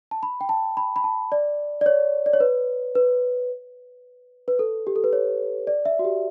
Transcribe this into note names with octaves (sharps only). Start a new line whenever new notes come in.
A5
B5
G5
A5
B5
B5
A5
D5
D5
C#5
D5
C#5
B4
B4
B4
A4
G4
A4
B4
C#5
D5
E5
F#4
G4